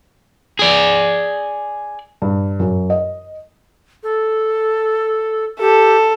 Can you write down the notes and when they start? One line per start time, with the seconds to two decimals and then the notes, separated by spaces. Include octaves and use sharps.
0.59 G#4 D5
2.22 G2
2.60 F#2
2.90 D#5
4.03 A4
5.60 G4 A4